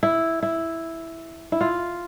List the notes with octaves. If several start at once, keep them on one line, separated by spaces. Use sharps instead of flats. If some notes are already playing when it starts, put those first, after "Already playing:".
E4
E4
E4
F4